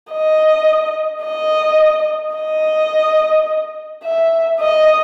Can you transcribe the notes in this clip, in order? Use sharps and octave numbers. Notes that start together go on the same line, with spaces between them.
D#5
D#5
D#5
E5
D#5